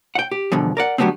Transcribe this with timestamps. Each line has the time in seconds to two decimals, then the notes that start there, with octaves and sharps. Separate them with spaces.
0.15 F#5 G5
0.31 G4
0.52 E2 G2 B2 D3 F3
0.77 A#4 D5 F#5
0.98 D3 F#3 G3 A3 B3 C4